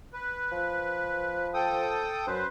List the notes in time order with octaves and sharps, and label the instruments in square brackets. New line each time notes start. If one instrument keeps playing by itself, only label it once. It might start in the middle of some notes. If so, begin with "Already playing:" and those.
[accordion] B4
[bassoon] F3
[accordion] A4 G5 D#6
[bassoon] F#2 [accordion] B4 C5